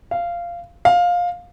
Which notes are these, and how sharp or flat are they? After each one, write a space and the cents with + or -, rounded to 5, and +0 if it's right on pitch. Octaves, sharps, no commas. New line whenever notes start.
F5 -15
F5 +15